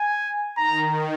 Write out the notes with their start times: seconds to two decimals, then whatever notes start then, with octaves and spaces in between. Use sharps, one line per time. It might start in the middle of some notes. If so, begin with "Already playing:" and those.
Already playing: G#5
0.57 D#3 A#5